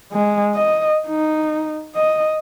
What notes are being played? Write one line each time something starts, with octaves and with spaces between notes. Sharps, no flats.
G#3
D#5
D#4
D#5